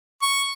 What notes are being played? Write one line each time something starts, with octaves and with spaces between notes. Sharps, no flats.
C#6